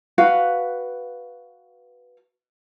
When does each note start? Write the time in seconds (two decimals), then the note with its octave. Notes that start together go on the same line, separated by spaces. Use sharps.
0.18 F#4 B4 F5